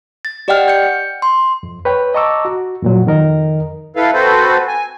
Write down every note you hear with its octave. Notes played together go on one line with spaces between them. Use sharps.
A6
G4 D5 D#5 F#5 G5 F6
G6 C#7
C6
F2
B4 C#5 G5
D#5 A5 A#5 C#6 D6 E6
F#4
F2 A#2 F#3
F2 D#3 A#4 D#5
E4 A4 B4 F5
C4 F#4 A4 B4 C5
G#5